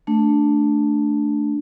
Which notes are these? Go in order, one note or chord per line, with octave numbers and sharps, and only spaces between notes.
A3 D4